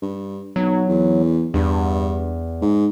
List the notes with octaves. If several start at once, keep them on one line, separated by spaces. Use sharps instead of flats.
G2
B1 F#3
E2
E2 G2
G#2